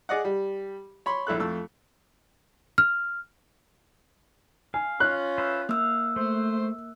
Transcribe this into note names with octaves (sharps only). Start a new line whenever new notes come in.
G#4 D5 D#5 F#5
G3
C#5 B5 C6
A#1 E4 A4 F#6
F2 A3 E6
F6
F5 G#5
C#4 F4 F#6
B4 C5 E5
A#3 F5 E6
A3 C5